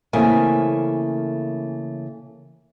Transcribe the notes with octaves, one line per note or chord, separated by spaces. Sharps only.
C#3 E3 A3 A#3 C4 G#5